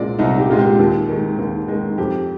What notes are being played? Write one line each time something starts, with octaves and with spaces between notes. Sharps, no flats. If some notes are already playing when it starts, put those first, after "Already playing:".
Already playing: C2 A#2 G#3 D5
C2 D#4
G4
A#2 G#3 F4
G4
D#2
D#3 G#3
D#2
D#3 G#3
F2 G4